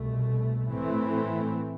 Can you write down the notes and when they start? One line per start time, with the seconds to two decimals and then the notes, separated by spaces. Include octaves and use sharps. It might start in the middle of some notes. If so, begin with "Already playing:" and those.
Already playing: C2 B2 A3
0.68 A2 E3 A3 C4